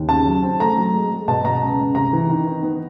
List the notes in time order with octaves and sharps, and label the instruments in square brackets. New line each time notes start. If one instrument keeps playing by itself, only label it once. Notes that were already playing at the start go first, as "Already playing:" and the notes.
Already playing: [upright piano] D#2
C#3 A5
F#3
C4
A3 A#5
F#3
G#3
G#3
B2 A5
B2 A#5
C#2
C#2
C3 A#5
E3
D#3
D#3
B3